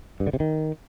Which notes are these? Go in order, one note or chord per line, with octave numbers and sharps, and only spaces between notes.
G2
D3
C3
D#3